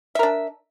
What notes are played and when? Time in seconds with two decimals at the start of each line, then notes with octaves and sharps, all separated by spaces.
0.15 E5
0.19 A#4
0.23 D4